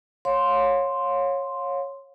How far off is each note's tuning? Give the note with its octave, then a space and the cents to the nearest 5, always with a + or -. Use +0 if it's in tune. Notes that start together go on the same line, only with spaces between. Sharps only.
C#5 -15 F5 +30 C6 +0